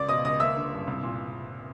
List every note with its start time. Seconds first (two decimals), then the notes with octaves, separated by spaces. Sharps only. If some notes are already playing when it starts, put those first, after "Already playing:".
Already playing: C#2 D5 D6
0.09 B2 D#5 D#6
0.25 C#2 D#5 D#6
0.40 A#3 E5 E6
0.56 D3
0.73 G2
0.87 C2
1.03 A#2